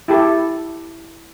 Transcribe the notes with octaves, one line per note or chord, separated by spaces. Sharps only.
E4 G4 A4